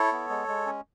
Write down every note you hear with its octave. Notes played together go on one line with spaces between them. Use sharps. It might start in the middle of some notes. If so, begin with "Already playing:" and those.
Already playing: E4 A4 C#5
B3
G#3
G#3
C#4